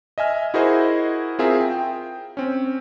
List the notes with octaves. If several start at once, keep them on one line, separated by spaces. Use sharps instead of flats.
D#5 E5 G#5 F6
E4 F#4 G#4 A#4 C5 D#5
C4 F4 G#4 A#4 E5
G5
C4 C#4